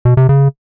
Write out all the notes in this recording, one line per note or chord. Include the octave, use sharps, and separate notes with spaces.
B2
C3
C#3